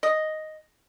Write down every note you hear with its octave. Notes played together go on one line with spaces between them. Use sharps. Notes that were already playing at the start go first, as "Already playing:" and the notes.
D#5